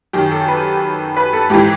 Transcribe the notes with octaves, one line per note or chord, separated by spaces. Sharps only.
F#2 D#3 G4
A4
B4
B4
A4
G#2 E3 G4